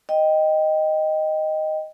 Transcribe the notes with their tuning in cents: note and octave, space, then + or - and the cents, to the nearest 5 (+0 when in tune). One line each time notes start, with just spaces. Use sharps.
D#5 +0 G5 +0